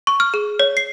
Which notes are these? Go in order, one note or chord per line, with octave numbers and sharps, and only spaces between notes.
C#6
F6
G#4
C#5
C7